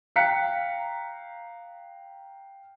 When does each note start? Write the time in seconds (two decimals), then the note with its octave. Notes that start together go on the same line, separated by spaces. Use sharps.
0.16 F5 G5 A#5 F#6 B6 C#7